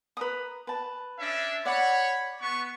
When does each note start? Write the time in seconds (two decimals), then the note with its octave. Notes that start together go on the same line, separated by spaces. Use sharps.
0.17 B4 A#5 D#6
0.67 B4 A5
1.19 C#4 D4 E5
1.65 C#5 D5 F#5 B5
2.41 B3 C#6